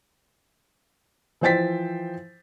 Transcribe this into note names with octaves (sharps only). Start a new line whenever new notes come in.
E3 F3 C5 G5 A6 B6